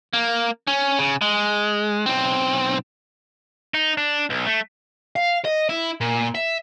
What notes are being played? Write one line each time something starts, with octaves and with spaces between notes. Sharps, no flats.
A#3
C#4
C#3
G#3
B1 C4
D#4
D4
B1
A3
F5
D#5
E4
A#2
E5